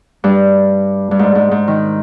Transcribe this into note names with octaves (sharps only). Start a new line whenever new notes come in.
G2
G2
G#2
G#2
G#2
D#3